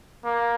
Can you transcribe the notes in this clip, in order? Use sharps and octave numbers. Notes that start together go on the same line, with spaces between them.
A#3